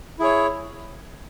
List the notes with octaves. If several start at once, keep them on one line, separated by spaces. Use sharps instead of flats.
E4 G#4 C#5